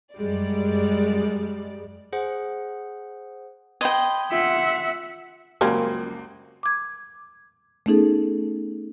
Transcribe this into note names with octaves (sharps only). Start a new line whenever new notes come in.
F#2 G3 G#3 D5
G#4 C5 F#5
D#5 G5 B5 C6 G#6
F4 E5 F#5
C#2 F#2 F3 G3 A#3 C4 F#4 G#5
D6 G#6
A3 B3 C#4 D#4 G#4 A4